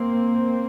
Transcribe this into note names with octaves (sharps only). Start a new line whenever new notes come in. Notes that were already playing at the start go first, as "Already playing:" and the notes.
Already playing: A#3 C4